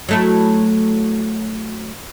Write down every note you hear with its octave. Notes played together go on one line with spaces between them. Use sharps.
F#3 A3 E4